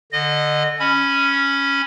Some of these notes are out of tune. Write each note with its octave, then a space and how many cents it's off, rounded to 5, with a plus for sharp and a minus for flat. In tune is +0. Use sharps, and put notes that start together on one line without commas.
D3 +0 D#5 -25
C#4 +0 B5 +0